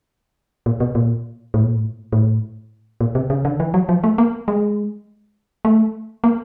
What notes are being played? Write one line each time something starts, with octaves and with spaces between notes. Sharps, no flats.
A#2
B2
A#2
A2
A#2
A2
A2
A#2
C3
C#3
D3
E3
F#3
F3
A3
A#3
G#3
A3
A#3